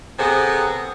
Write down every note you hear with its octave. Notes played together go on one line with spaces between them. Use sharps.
C3 B3 G#4 A4 C5